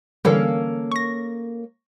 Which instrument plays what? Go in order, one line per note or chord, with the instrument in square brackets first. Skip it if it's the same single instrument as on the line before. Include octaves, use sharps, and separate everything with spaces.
[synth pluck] D3 E3 G3 [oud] A#3 C#4 A4
[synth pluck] C#6 A#6